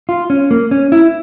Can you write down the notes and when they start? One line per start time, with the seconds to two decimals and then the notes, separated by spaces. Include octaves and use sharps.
0.09 F4
0.30 C#4
0.51 A#3
0.71 C#4
0.92 E4